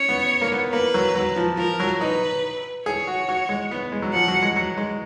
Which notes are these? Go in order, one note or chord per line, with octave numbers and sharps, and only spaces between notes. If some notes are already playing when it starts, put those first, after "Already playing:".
Already playing: C#4 C#5
B3
A#3
B3
A#3 B4
F#3
F#3
F3
F3 A#4
F#3
D#4 B4
G#4 C#5
F#4
F#4
G#3
B3
G#3
F#3
F3 F#5
F#3
G#3
F#3
G#3